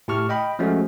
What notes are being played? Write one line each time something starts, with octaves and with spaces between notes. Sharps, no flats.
A2 G4 A5 C#6 F6
D#5 G5 B5
F3 G#3 A3 C#4 F#4